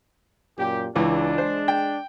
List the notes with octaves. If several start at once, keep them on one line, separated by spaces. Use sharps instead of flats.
F#2 A#2 G4
C#2 E3 G#3 D4
C5
G5